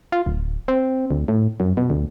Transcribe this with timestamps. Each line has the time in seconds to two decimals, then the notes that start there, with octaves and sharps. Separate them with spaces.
0.12 F4
0.26 D1
0.68 C4
1.11 D2
1.28 A2
1.60 F#2
1.77 B2
1.90 D2